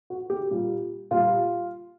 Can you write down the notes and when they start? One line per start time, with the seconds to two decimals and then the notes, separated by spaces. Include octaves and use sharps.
0.10 F#4
0.30 G4
0.51 A#2 G3
1.11 A#2 G3 F4